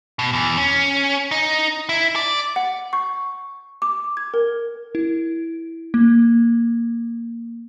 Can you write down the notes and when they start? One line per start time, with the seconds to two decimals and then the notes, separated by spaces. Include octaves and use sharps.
0.19 B2
0.33 E2
0.58 C#4
1.31 D#4
1.89 E4
2.16 D5
2.56 F#5
2.93 C#6
3.82 D6
4.17 G#6
4.34 A#4
4.95 E4
5.94 A#3